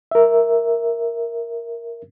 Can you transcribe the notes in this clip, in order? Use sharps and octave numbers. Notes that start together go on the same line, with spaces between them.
A#4 E5